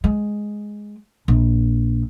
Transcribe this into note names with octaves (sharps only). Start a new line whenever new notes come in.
G#3
A#1